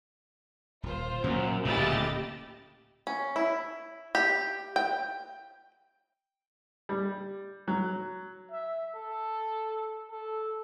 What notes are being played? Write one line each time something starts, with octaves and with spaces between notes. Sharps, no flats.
D#1 F4 C5
F#2 A#2 A#3
D1 A#2 C#3 A3 E4 G4 D#5 A6
C#4
E4
G4
G5
G3
F#3
E5
A4
A4